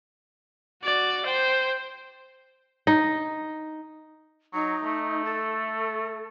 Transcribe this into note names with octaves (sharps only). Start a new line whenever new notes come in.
F#4 D5
C5 G5
D#4
F#3 D#4
A3
A4